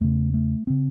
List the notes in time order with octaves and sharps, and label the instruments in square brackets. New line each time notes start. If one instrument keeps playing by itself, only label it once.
[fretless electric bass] E2 C#3 A3
A3
C#3 C4